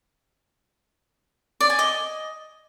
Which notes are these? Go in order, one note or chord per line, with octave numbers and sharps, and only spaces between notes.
D5
G#5
D#5